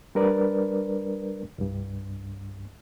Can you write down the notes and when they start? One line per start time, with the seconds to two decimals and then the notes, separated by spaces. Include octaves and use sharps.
0.15 G3 D4 A#4 B4 D5
1.58 C2 G2